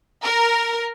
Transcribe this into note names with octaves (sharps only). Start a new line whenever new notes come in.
A#4